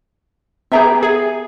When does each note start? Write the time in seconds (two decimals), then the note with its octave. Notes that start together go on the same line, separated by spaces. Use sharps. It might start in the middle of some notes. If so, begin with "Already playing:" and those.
0.72 B3 G4 G#4 E5 A#5
1.03 G#4